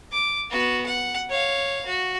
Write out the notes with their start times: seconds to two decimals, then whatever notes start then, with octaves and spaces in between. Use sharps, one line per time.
0.12 D6
0.51 B3 F#4
0.86 F#5
1.30 C#5 F5
1.86 F#4